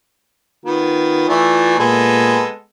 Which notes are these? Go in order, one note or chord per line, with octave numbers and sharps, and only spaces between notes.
D#3 B3 F4
E3 A3 D5
A#2 G#3 B3 A4